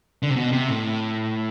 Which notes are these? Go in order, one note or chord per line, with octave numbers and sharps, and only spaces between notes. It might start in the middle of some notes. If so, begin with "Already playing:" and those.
D3
C3
B2
C3
A2